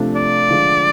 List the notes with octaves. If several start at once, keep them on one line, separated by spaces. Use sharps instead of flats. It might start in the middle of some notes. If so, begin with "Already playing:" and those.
Already playing: C3 F3 A3 D4
D5
D3 F3 G#3